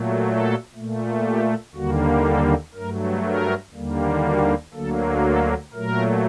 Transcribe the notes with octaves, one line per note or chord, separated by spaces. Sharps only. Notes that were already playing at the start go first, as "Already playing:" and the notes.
Already playing: A#2 F#3 A3
A4
A#2 A3
G4
D#2 D3 G3 A#3 F#4
A4
G2 F#3 A3 A#4
A#4
D#2 D3 G3 A#3
F#4
D2 D3 F#3 A#3 A4
A4
A#2 F#3 A3 A#4